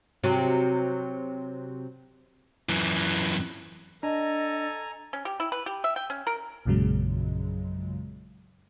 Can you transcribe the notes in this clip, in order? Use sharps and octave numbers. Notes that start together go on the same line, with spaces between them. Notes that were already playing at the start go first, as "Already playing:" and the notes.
C3 F#3
F#2 E3
D4 A4 D#5 G#5 A#5
C#4
G4
E4
B4
G4
E5
G5
C#4
A#4
A#1 F#2 A#2 C#3 F#3 G#3